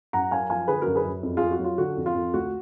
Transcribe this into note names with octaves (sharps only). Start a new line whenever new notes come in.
F#2 F#5 A#5
F#2 F5 G#5
F3 F5 G#5
D3 G#4 B4
F#2 F#4 A#4
G#4 B4
F#2
F2
F2 F4 G#4
F#4
F#3
F4
D3 F#4
F2
F4
F2
D2 F#4